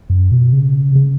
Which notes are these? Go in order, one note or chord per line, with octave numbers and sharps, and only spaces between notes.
F#2
B2
C#3
C#3